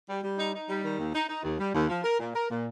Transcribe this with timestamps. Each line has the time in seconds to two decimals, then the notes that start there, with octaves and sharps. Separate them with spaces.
0.08 G3
0.23 G3
0.38 D#4
0.53 D#4
0.68 G3
0.83 D#3
0.99 D#2
1.14 D#4
1.28 D#4
1.44 D#2
1.59 G3
1.74 D#2
1.89 F3
2.04 A#4
2.19 A#2
2.34 A#4
2.50 A#2